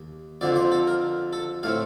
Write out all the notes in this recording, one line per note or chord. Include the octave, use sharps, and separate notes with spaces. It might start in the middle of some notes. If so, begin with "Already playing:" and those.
Already playing: D#2
F2 D3 F3 C4 D5
C5
A4
A#4
A4
A2 A3 C4 F5